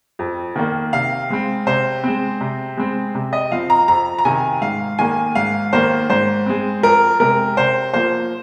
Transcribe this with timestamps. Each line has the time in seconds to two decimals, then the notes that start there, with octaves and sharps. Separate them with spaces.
0.19 F2
0.56 D#3 A#3
0.93 C3 F5
1.30 G#3 C4
1.67 C3 C5
2.04 G#3 C4
2.41 C3
2.77 G#3 C4
3.15 C3
3.33 D#5
3.51 F3 C4 F5
3.70 A#5
3.88 F2 A#5
4.19 A#5
4.25 C3 D#3 G#5
4.62 G#2 F5
4.99 D#3 A#3 G#5
5.35 G#2 F5
5.73 D#3 A#3 C5
6.10 G#2 C5
6.46 G#3 C4
6.83 F2 A#4
7.20 C3 G#3 A#4
7.57 C3 C5
7.93 F3 A#3 C5